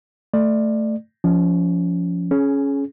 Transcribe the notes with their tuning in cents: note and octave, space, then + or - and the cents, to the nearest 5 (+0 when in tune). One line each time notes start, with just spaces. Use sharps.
A3 +5 D5 +20
F3 +0 C#4 +30
C#4 +0 G#4 +25